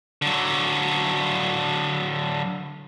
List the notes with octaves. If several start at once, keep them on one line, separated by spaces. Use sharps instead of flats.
D3 F#3